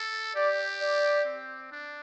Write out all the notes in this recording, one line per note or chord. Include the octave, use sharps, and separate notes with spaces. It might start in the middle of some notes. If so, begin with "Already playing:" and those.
Already playing: A4
G4 D5
D5
C4
D4